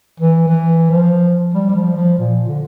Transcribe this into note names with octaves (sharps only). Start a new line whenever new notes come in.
E3
E3
F3
G3
G3
F3
F3
A#2
D3